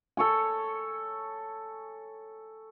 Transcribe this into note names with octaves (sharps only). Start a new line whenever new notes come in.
A4 C#5 G#5